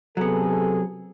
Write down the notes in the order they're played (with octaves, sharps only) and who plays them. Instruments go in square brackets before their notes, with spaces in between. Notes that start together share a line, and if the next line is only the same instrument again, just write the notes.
[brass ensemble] C3 G#4 A4 [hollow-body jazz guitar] F#3 B3